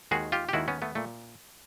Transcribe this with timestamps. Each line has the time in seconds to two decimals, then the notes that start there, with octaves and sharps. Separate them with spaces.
0.11 D#2 D#3 G#3 F#4 G#4
0.32 F4 G4
0.49 G4
0.53 D#2 D#3 G#3 E4 F#4
0.68 B3 C#4
0.82 A3 B3
0.95 A#2 A3